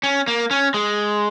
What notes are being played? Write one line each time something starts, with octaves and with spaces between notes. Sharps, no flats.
C#4
A#3
C#4
G#3